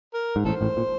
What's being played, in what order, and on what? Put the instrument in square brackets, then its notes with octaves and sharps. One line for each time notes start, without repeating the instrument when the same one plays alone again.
[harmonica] A#4
[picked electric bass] G#2
[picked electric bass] A1 A2 [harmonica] A4 C5
[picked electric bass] A1 A2
A#2